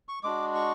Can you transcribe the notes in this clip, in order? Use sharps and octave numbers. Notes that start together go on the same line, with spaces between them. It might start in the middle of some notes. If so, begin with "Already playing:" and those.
C#6
G#3 D4 F#4 D6
C#6